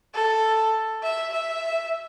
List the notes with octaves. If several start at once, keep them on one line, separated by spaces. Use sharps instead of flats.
A4
E5
E5